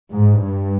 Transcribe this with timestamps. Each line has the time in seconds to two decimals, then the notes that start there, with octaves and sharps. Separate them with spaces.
0.13 G#2
0.44 G2